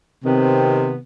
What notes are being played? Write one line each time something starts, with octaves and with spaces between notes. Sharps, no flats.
C3 D#3 B3 C4